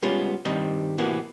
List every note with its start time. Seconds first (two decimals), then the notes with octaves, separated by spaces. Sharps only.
0.02 G3 G#3 B3 C#4 F4
0.45 G2 D#3 G3 C4 D#5
0.98 A2 C3 E3 A#3 B3 F#4